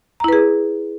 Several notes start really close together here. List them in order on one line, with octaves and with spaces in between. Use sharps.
A#5 E4 B4 G#4